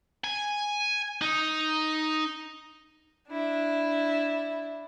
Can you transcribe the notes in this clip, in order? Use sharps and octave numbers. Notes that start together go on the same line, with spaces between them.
G#5
D#4
D4 E4